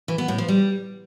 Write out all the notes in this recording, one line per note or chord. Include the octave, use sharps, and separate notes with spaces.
E3
B3
A2
F3
G3